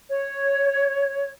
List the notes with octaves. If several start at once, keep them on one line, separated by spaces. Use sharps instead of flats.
C#5